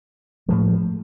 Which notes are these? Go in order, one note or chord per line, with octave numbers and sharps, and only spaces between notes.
A2 F3 G#3